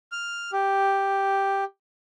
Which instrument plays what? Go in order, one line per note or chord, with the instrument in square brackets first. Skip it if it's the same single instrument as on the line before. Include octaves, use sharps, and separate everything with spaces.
[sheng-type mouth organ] F6
G4